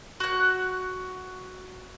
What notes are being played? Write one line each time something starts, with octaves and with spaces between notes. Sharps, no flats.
F#4 F#6